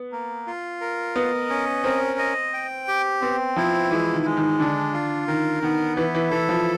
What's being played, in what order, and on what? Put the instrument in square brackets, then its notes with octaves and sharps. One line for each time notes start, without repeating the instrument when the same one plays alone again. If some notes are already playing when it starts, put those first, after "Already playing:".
Already playing: [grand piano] B3
[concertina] A#3
F4
A#4
[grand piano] B3 [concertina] D#5
[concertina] C#4
[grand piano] C4 [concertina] A#4
[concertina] D#5
G5
G4
[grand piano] B3 [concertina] C4
[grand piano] F3 [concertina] E4
[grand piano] E3 [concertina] G#3
[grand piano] D#3
[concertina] G#3
[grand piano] D#3
[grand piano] D3 [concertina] D4
[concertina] F4
[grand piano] D#3 [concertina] A#4
[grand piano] D#3 [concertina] B3
[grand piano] E3 [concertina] E4
[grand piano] E3
[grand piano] E3 [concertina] A4
[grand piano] F3